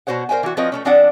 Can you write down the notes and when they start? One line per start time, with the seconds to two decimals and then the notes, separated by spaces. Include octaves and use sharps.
0.07 B2 F#4 C5 C#5 F#5
0.29 A#4 C5 E5 G5 G#5
0.43 E3 F#4
0.57 F3 C4 F4 B4 C#5 D#5
0.72 A3 A#3 C#4
0.85 F3 C4 D4 D5 F#5